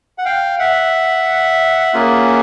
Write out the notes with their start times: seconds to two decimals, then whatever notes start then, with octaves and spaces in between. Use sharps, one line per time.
0.18 F#5
0.25 F5 G5
0.59 E5 F#5
1.94 A#3 C#4 F4 G#4